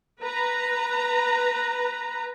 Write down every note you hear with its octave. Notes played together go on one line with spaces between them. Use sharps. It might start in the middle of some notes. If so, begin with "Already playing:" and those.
B4 A#5